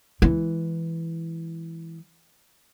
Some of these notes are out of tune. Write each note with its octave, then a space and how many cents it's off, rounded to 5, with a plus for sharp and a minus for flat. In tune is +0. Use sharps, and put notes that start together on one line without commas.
E3 +0 G#3 +0